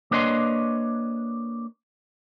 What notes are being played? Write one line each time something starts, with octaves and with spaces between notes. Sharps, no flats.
A#3 D4 B4 C#5 D#5 C6